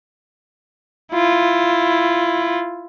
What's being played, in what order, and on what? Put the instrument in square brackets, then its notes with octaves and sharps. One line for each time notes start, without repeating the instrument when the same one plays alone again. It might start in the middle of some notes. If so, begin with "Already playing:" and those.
[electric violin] E4 F4